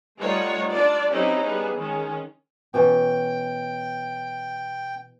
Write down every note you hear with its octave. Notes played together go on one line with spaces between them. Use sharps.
G3 A3 D#4 F4 C#5 F#5
D4 F4 D5
F#3 C4 C#4 D#4 E4 G4
G3 B3 G#4
D#3 G#3 C#4
B2 E3 C#4 G5